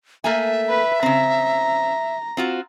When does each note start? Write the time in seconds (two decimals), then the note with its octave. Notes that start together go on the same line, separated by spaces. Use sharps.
0.24 A3 A#3 E5 G#5
0.69 B4
1.03 C#3 C4 A#5
2.37 C4 F4 F#4